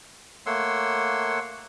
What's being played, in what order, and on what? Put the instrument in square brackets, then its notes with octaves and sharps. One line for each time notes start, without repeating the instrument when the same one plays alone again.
[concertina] A3 A#3 C#5 F#5 C6 E6